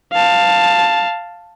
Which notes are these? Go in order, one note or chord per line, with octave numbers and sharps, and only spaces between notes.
F5 A5